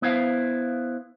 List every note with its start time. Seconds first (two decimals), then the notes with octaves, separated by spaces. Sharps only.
0.02 B3 E4 C5 F5